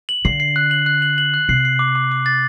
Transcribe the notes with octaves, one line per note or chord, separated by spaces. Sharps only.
F#7
D3 C7
C7
F#6
F#7
F#6
F#7
F#7
F#6
C3 C7
C7
D6
D6
D6
A6